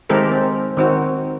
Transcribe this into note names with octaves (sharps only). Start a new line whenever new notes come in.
D#3 G#3 C4 G4 A4 A#4
C4
D#3 C4 F#4